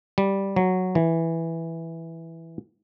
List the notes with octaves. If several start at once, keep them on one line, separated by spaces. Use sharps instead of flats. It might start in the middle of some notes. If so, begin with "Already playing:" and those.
G3
F#3
E3